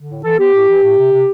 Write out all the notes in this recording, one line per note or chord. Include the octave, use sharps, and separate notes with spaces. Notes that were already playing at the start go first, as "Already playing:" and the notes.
Already playing: D3
A2
E3 A4
B3 G4
A2
E3
A2
C3
C3